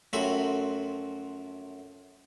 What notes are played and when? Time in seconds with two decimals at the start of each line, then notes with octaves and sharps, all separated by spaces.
0.13 F#2 F3 A3 C4 F#4 B5